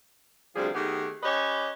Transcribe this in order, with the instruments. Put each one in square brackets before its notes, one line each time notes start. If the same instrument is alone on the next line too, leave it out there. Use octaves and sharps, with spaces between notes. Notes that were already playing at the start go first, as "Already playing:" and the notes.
[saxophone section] D2 C3 F3 G3 G#4
D#3 A3 B3 G4 G#4
C#4 G4 B4 C#5 D#5